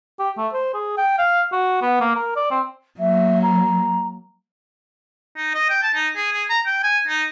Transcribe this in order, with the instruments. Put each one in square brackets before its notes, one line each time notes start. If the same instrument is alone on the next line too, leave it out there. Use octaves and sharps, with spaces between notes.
[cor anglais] G4
A3
C5
G#4
G5
F5
F#4
B3
A#3
A#4
D5
C4
[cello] F#3 A#3 [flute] E5
[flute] A#5
[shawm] D#4
D#5
G5
A5
D#4
G#4
G#4
A#5
G5
G#5
D#4